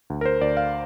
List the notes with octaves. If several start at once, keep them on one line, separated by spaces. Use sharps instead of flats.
D2
A#4
C5
D2 D5
F5